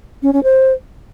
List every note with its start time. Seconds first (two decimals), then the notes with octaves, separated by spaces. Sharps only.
0.23 C#4
0.33 C#4
0.44 C5